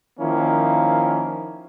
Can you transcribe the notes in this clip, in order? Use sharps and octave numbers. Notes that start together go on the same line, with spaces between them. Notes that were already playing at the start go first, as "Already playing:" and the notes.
D#3 F3 A#3 C#4 E4